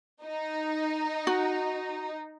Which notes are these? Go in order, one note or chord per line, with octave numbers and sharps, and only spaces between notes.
D#4
F#4